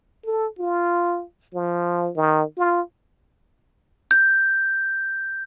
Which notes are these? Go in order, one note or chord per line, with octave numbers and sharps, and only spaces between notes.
A4
F4
F3
D#3
F4
G6